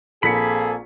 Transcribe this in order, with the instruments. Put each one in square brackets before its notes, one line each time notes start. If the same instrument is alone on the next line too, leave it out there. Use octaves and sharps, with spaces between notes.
[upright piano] A#1 B6 C#7 [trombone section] A#3 C4 G#4 [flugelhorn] A4 [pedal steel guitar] B5